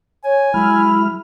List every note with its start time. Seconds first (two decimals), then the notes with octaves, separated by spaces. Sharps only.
0.24 C#5 G#5
0.54 F#3 G#3 E4 B5 F6